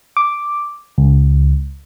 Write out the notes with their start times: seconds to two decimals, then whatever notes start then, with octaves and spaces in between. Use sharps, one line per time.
0.17 D6
0.98 C#2